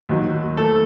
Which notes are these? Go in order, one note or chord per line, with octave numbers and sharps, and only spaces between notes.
D#2 D#3 F#3
A3 A4